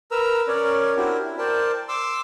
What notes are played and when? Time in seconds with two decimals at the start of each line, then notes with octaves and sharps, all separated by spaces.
0.11 A#4 B4 A#5 E6
0.48 C#4 A#4 C#5 D5
0.96 C4 D4 E4 F#4 G4 A#4
1.24 E4
1.38 A#4 C5 D5 G5 A5
1.88 C6 D6 E6